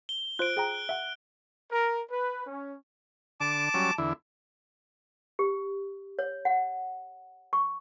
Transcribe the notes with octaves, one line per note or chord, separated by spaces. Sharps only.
G7
F4 C5 F#6 D7
G#4 G5 A#5
E5 F#5
A#4
B4
C#4
D3 A5 D6
F#3 G3 C#4
E2 D3 E4
G4
C#5
F#5
C#6